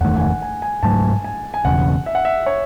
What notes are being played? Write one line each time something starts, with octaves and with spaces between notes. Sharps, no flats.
F#1 E2 D#3 A3 F#5
G#5
F#5
G#5
G#5
G#2 F#3 A3 A5
G#5
G#5
E1 E2 C#3 F#5
E5
F#5
E5
C#5